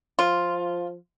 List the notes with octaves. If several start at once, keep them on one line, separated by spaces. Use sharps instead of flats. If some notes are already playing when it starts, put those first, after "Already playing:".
F3 F4